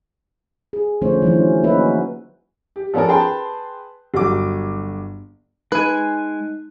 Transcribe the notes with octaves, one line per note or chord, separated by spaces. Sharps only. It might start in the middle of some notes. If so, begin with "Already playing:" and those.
G#4
D3 F3 A3 C#4 C5 C#5
E3 F#3 C#4
A#3 C#4 D#4 F#4 B4 E5
G4
F3 B3 C#4 A4 A#4
G#4 B4 G5 A5 C6
G1 F#3 D6
G#3 D#4 B4 G#5 F#6